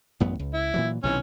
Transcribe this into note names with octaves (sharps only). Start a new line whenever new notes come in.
A1 F#2 B3
C#2
E4
A#2 E3 F#3
B1 C3 D#3 E3 C#4